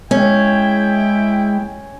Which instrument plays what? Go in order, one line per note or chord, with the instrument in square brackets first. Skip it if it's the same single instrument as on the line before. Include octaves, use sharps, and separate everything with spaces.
[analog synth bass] G#3 [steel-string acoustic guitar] C#4 [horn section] E4 G5